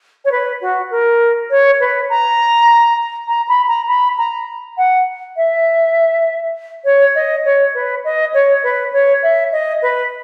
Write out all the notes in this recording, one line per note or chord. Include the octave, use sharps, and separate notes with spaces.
C#5
B4
F#4
A#4
C#5
B4
A#5
A#5
B5
A#5
B5
A#5
F#5
E5
C#5
D#5
C#5
B4
D#5
C#5
B4
C#5
E5
D#5
B4